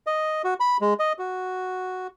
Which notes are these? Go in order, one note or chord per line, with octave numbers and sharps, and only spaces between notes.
D#5
F#4
B5
G#3
D#5
F#4